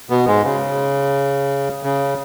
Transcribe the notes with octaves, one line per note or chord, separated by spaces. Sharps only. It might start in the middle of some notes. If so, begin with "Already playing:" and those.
B2 B3
G#2 G#3
C#3
C#3